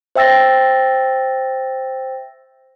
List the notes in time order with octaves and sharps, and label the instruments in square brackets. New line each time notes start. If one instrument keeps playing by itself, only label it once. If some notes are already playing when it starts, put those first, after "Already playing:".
[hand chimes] C5 E5 G5 E6 A6 A#6